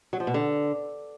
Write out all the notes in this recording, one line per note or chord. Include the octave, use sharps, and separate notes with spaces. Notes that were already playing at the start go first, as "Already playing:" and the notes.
F#3
F3
B2
D3